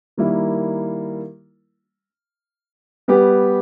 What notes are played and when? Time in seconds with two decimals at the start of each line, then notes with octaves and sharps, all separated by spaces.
0.17 D#3 G3 A#3 E4 A#4
3.08 G3 B3 G4 B4